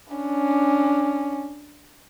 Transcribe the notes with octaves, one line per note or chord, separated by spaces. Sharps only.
C#4 D4